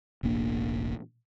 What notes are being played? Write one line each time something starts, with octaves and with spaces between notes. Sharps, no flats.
E1 A1 A#3 D4